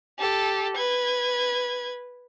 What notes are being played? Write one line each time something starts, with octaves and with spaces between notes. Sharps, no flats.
G4 A4
B4 G#6